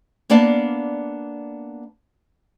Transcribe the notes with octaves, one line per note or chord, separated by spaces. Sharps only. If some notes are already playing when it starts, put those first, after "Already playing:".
A#3 B3 D4 D5 F5 A5